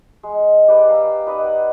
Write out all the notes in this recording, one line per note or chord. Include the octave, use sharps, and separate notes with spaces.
G#3
G4 B4 D5 D6
F5 A#5 E6
G5
D#4 B4 D5 D#5
F#5